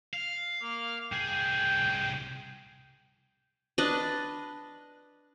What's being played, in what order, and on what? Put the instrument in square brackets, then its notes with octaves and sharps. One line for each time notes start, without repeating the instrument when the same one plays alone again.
[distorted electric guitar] F5
[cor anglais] A#3
[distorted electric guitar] C2 G#4 [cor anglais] G5
[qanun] D4 B4 D#5